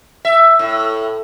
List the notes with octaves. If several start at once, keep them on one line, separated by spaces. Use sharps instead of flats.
E5
A2